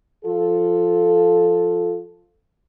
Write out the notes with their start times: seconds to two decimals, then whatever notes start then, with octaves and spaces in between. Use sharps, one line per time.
0.25 F3 F4 A4